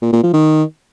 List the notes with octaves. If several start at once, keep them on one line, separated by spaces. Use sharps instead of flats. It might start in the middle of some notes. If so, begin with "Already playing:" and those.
A#2
A#2
F3
D#3